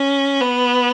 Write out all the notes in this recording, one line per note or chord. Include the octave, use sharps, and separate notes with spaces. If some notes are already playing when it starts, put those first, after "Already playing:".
Already playing: C#4
B3